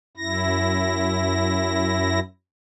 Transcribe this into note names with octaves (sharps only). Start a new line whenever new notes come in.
F#2 E4 A#6